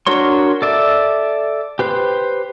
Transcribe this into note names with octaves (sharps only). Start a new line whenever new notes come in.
D4 F#4 A#4 C#5 C6
A4 D5 E5
G4 B4 C5